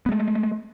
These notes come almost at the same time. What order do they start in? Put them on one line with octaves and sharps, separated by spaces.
B3 G#3 A3